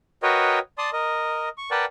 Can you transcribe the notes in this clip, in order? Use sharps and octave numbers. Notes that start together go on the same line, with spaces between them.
F#4 A#4 B4 C#5 D#5 G5
D5 A5 C6 D#6
A#4 D#5
C#6
A#4 B4 D5 F#5 G5 A5